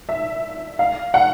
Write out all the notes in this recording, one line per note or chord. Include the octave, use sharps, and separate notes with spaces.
E5
F5
F#5